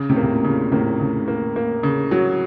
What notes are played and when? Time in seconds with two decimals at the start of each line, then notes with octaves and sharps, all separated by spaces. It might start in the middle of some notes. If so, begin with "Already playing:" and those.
Already playing: C#3
0.09 A2 C3
0.16 A#3
0.23 C3
0.30 A#2
0.44 C#3
0.51 A#2
0.72 A2 C3 A#3
1.00 C#3
1.28 A#3
1.56 A#3
1.83 C#3
2.11 F#3